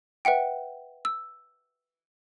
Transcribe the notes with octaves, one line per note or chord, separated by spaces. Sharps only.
B4 E5 F#5 G5
E6